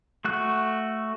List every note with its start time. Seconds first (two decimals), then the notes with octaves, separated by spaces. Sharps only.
0.25 A3 F#4 F#6